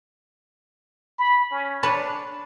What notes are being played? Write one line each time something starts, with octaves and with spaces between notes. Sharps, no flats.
B5
C#4
D4 B4 C#5 A5